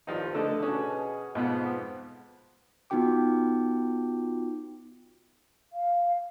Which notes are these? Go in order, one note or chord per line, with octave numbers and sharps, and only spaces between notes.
C2 G2 D#3 F3 D#4
D3 A3 A4 D#5 A5
B2 C#4 F#4 G#4
F2 G#2 B2 F3 B3
B3 D#4 F4 F#4 G5 D6
F5